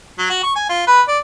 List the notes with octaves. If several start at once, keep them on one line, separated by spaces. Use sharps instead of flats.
F#3
F#4
C#6
G#5
F4
B4
D5